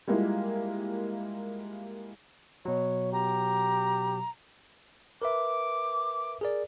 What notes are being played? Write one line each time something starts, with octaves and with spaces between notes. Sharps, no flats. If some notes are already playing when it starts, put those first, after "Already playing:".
G3 G#3 A#3 E4 F4
B2 F#3 C#5
G4 A#5
A#4 B4 E5 D6
G#4 A#4 D5